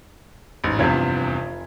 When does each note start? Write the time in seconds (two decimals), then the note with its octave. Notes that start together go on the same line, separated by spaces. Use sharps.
0.64 A1 G#2
0.79 F1 E2 G2 C3 F4 G#6